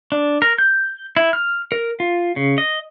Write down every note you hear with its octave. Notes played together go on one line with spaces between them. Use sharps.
D4
A#4
G6
E4
F6
A#4
F4
C#3
D#5